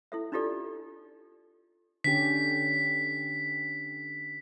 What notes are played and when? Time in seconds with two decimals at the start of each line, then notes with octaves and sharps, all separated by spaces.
0.12 E4 A4 E5
0.32 D4 D#4 F4 G4 A4 D5
2.04 D3 C#4 G4 B6